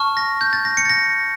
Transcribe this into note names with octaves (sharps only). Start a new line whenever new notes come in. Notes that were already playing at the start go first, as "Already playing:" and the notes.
Already playing: A5 C#6 F6
A#6
G6
A6
A#6
C#7
A6
A#6